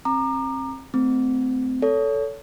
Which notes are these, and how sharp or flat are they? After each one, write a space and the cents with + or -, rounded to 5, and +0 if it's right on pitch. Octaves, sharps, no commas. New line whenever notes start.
C4 +30 A#5 +0 D6 +35
A3 -10 C4 -25
A4 +0 C#5 +30